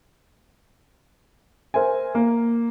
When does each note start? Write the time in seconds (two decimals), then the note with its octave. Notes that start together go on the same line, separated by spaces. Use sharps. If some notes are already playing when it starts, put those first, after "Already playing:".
1.74 A#4 C5 E5 G#5
2.15 A#3